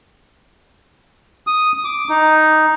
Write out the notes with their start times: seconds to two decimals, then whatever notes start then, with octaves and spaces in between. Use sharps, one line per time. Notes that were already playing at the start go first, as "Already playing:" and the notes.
1.47 D#6
1.84 D6
2.09 D#4